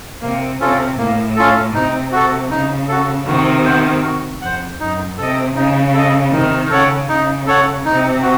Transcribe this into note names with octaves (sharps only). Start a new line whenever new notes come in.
C3 A#3
C3 C#4 F4 A4
A2 A#3
C#4 F4 A4
C3 D#4
F#4 A4
C#3 D#4
F#4 A4
C3 D#3 F#4
C5 F#5
F#4
F2 C5 F#5
F#2 D#4
C3 A4 D#5
C#3 D#4
A4 D#5
C3 D#3 D#4
C#3 A4 C#5 F#5
C#3 D#4
A4 C#5 F#5
C3 D#4
F#4